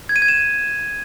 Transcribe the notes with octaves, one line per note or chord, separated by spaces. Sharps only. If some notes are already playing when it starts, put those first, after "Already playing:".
G#6
D#7
G#6
E7